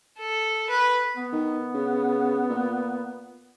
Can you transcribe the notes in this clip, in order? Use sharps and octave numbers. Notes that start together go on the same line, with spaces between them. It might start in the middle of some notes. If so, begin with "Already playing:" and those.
A4
B4
B3
D#3
C#3
A#2